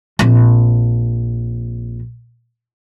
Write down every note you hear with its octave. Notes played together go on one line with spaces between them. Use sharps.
A#1 C4